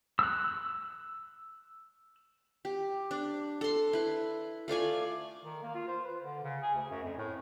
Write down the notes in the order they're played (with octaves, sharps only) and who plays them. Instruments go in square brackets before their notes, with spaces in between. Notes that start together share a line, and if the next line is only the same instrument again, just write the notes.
[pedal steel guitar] E6 F#6
[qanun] G4
D4
A4 C6
E4 B4
A3 F4 D5 G#5
[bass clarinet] D#3
A#3
F4
C5
B4
D3
C#3
G#4
D2
F#2
F2
A2